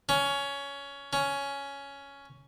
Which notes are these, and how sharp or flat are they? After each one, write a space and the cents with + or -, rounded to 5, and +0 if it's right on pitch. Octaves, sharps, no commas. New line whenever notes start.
C#4 +15
C#4 +10